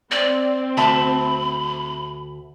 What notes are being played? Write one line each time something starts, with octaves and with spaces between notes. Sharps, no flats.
C4 D5
D2 E5 A5 B5